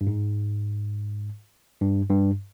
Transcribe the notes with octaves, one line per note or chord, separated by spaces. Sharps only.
G2
G#2
G2
G2